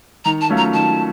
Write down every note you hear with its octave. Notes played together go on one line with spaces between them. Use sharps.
D#3 A#5
A5
F#3 A3 C#4 F4
A#5
D#3 A5